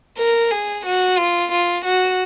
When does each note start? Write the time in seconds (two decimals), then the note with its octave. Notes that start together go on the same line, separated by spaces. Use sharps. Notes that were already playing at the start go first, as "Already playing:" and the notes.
0.18 A#4
0.51 G#4
0.85 F#4
1.18 F4
1.52 F4
1.85 F#4